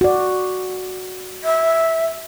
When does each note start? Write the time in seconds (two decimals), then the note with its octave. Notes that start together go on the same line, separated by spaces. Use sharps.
0.01 F#4 D5
1.44 E5